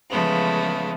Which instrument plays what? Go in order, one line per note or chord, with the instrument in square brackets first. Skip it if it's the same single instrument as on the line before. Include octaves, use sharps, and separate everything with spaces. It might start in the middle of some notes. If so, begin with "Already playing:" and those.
[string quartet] C#3 E3 F3 G#3 A3 B3